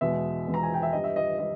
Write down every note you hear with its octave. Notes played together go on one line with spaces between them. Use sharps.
E2 B2 G#3 E5
E2 B2 G#3
A#5
G#5
G5
E5
G2 G3 D#5
E5
D#5
G3 D#5